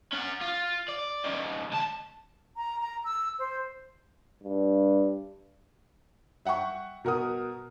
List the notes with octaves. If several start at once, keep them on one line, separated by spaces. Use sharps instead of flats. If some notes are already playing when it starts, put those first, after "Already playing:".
C#4 F#5
F4
D5
D#3 C#4
C#2 A5
A#5
A#5
E6
C5
G2
E5 F#5 G5 C#6
B2 A#4 F#5 D#6